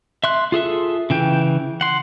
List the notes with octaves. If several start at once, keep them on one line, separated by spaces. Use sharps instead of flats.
E5 C6 F#6
F4 G#4 A4 E5
C#3 E3 G5
F#5 C6